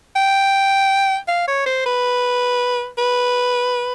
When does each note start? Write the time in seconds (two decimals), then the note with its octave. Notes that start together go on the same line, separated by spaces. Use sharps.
0.16 G5
1.28 F5
1.48 C#5
1.66 C5
1.86 B4
2.98 B4